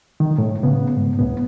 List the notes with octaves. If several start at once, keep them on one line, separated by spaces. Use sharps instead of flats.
D#3
A2
C#3 B3
G#2
C#2 A2 B3